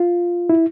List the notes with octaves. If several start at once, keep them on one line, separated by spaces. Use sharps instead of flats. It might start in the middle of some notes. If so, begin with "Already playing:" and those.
Already playing: F4
E4